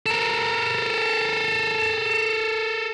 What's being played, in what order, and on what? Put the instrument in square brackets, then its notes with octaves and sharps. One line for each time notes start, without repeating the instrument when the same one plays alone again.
[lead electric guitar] A4 A#4